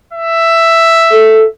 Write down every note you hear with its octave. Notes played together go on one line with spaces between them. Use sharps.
E5
A4